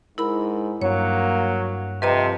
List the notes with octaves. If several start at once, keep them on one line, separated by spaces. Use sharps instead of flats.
G#2 E4 A#4 B5
G2 F#3 A#3 C#5
F2 C3 B4 D#5 A#5